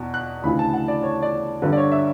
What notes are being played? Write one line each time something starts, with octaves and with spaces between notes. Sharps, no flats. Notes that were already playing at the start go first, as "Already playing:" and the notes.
Already playing: E2 B2
F#6
D2 C#3 E3 B5
A5
F#5
D5
C#5
D5
G1 G2 D3 B4
D5
C#5
E5